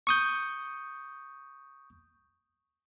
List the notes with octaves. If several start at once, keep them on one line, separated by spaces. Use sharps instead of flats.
C#6 D#6 G6